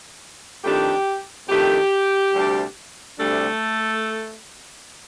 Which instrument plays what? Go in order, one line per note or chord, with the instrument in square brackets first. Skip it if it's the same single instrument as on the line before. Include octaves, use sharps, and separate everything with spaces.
[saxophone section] F2 D#3 A3 D4 G4
F2 D#3 A3 D4 G4
D2 C3 G3 D4
D2 C3 G3 A3 D4 A4